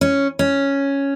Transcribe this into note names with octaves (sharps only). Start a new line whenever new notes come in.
C#4
C#4